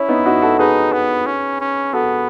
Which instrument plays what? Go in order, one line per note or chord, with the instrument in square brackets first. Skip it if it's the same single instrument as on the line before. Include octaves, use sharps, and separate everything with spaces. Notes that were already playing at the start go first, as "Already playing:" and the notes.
Already playing: [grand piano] C#4 [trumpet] E4
[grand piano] B3 D#4
D#4 F#4
F#4 A4
[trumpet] D#4 [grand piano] G#4 B4
[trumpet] B3
C#4
C#4
[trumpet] B3 [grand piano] F#4 A4